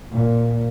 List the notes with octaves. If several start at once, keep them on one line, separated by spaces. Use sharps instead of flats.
A#2